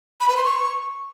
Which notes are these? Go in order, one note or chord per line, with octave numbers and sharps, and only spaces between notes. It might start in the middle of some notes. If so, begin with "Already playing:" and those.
B5
B4
C6
C#6